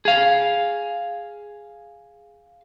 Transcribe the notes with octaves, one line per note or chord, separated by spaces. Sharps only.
G#4 F5